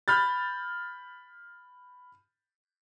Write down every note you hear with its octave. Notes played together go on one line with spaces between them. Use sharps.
B5 F6 G6 A6